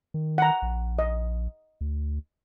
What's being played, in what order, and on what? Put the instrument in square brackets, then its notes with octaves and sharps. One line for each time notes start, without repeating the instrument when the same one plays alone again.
[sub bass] D#3
[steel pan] F#5 A#5
[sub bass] A#1
[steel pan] D#5
[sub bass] D2